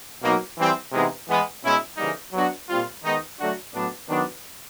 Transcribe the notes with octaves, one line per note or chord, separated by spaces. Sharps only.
B2 F#3 A#3 D#4
E3 G3 C4 E4
C3 E3 G#3 B3 D#4
E3 G#3 B3
B2 G#3 C#4 E4
C#3 E3 G3 A#3 D#4
F#3 B3 D4 F#4
A#2 G3 C4 F4
D#3 G#3 B3 D#4
D3 F#3 A3 D4 F#4
A2 F#3 B3 D4
D#3 F#3 B3 D4